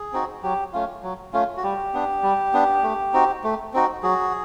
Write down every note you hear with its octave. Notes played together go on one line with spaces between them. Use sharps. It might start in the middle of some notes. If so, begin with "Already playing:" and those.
Already playing: G#4
C4 D#4 F#4
F#3 G4
A3 C#4 F4
F#3
A3 C#4 F4
F#4
G3 G4
B3 D4
G3
B3 D4
A3
C4 D#4 F#4
A3
C4 D#4 F#4
F#3 F#4 G#4